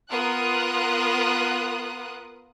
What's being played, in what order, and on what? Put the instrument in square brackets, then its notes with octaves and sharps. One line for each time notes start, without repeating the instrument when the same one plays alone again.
[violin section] B3 F4 A#4 D#6 F#6